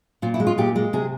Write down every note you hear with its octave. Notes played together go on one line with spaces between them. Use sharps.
A#2 F4
E4
G#3
F4
A#2 G4
G#3
C3 G#4